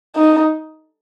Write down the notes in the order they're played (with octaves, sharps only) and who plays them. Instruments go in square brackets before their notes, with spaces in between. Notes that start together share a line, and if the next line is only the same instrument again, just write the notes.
[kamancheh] D#4